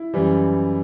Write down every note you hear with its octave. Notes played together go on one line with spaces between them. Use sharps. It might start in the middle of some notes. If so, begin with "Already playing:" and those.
Already playing: E4
F#2 E3 G3